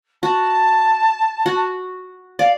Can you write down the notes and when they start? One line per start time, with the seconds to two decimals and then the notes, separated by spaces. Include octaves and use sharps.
0.23 F#4 A5
1.46 F#4
2.39 D5 F5